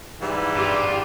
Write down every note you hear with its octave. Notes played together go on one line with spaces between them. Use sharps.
G#2 E3 G3
G2 F4 G4 D5